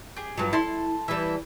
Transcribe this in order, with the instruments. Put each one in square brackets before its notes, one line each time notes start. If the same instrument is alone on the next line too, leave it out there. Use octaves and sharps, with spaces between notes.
[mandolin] G4 G#4
[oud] G2 F3 F#3
[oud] E4 [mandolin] A4 A5 C6
[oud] E3 G3 [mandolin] E5 G#5 A5